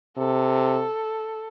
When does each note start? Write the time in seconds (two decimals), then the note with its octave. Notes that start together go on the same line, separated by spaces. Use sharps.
0.18 C3 A4